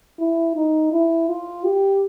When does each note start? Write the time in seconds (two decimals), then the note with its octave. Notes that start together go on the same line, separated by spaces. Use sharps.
0.19 E4
0.56 D#4
0.92 E4
1.28 F4
1.64 G4